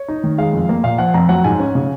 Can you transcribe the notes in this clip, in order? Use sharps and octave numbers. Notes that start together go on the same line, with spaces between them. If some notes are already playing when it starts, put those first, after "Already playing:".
Already playing: C#5
D#4
D#3
G#3 F5
F2
A#3
A#2 F5
F3 F#5
F2 A#5
F#3 F#5
G#2 G#5
C#4
C#3